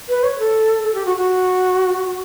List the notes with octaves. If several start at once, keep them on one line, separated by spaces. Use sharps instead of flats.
B4
C#5
A4
A4
G4
F#4
F#4